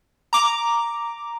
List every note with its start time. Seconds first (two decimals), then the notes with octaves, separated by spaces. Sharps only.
0.33 A#5 D6